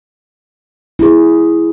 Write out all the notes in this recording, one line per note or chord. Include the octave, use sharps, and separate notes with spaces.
E4 G#4